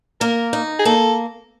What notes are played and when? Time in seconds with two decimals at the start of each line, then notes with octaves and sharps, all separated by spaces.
0.21 A#3 A#4
0.53 D#4
0.79 G#4
0.85 A#3 A4